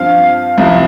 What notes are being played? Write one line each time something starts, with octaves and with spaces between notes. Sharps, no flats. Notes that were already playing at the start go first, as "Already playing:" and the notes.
Already playing: G2 F3 C4 F4 F5
C2 C3 F3